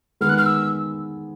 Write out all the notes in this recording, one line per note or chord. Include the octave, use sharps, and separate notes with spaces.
D#3 G#3 B3 F6
F#6
F6
E6